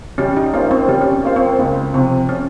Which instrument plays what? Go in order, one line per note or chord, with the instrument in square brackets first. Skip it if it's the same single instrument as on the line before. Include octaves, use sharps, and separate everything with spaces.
[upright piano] G3 [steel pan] C#4
[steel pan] D#4
[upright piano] A#3 F4 C5 [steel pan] C#4
[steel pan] C4
[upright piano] G3 [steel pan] C#4
[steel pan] C#4
C4
[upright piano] A#3 F4 C5
[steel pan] C4
[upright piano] C#2 [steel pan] A#3
[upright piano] C3 F3 [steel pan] C4
[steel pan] C#4